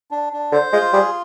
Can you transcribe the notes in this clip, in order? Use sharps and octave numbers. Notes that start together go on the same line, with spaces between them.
D4
D4
D3 C5
G#3 F4
G3 G#4